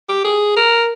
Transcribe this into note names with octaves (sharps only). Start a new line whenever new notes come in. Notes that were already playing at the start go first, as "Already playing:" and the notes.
G4
G#4
A#4